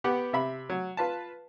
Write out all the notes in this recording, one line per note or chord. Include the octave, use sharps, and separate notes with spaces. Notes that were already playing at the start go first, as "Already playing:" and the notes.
B3 G4 F#5
C3 E5 B5
F#3
F4 B4 A5